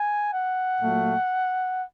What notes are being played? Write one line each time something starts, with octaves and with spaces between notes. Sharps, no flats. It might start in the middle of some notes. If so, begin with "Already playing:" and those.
Already playing: G#5
F#5
A#2 F#3 A3